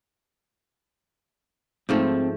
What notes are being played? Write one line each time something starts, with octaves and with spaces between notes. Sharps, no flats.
G#2 F3 A3 C4